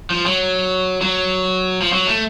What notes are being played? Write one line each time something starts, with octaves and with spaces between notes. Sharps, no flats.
F3
F#3
F#3
F3
F#3
A3